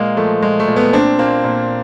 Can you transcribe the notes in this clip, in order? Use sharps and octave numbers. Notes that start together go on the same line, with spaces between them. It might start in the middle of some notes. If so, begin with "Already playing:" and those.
Already playing: A#2 G#3 A#3
F3 A3
A#2 G#3
A3
A#2
A3 B3
A#2 C4 D4
A#2 A#3 C4
A#2